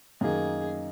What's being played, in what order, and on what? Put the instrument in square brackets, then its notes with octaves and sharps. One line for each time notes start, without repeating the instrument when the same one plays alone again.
[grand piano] F#2 D#3 A#3 D#4 [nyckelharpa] G#4